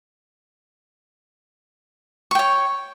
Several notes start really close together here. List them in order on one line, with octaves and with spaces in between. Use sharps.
C#6 G5 C#5